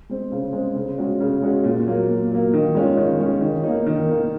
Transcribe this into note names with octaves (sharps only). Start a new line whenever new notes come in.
G#3 C4
C#3
G#3 C4
C#3
G#3 C#4 F#4
C#3
G#3 C#4 F#4
A#2
F#3 A#3
A#2
F#3 A#3
D#3
G#3 C#4 F4
D#3
G#3 C#4 F4
D#3
A#3 D#4
D#3
A#3 D#4